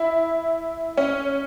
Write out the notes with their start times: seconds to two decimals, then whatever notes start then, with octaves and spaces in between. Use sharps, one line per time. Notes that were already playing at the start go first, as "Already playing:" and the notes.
Already playing: E4
0.97 C#4